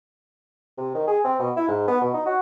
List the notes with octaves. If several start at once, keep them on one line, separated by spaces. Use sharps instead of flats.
C3
D#3
G#4
C4
B2
E4
G#2
B3
B2
D#4
F#4